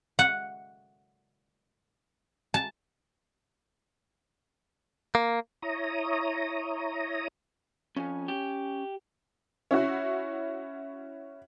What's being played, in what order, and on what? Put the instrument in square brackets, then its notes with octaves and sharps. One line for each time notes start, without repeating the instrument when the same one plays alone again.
[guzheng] F#5
A5
[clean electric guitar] A#3
[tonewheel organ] E4 C#5 A#5 D#6
[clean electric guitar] F2 [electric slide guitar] C#4 G#5
[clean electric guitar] G4
[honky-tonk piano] C#4 E4 F#4